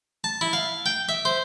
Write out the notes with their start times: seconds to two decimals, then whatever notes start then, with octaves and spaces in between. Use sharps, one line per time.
0.24 A5
0.41 E4
0.53 F5
0.86 G5
1.09 E5
1.25 C5